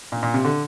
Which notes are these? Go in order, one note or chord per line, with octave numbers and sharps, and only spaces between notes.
A#2
A#2
C3
D3